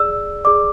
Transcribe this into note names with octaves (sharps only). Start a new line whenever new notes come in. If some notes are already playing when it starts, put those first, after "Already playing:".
Already playing: G#4 D5 E6
G#4 D5 D6